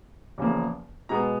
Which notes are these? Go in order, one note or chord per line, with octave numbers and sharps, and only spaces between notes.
E2 C#3 F3 A#3
B2 G#3 B3 A#5